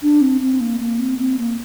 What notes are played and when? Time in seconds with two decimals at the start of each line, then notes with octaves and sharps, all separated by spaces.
0.02 D4
0.21 C4
0.41 C4
0.60 A#3
0.80 A#3
0.99 C4
1.19 C4
1.38 A#3